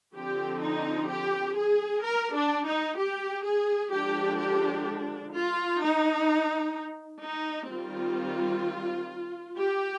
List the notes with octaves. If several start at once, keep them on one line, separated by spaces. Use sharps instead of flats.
D3 F3 C4 G4
D#4
G4
G#4
A#4
D4
D#4
G4
G#4
D3 F3 G#3 D4 G4
G4
F4
D#4
D#4
D#3 G3 C4 F4
G4